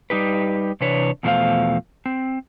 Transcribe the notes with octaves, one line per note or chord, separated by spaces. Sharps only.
G3 D#4 G4 B4
C3 E3 D4 B4 C#5
E2 B2 F3 A3 C5 F5
C4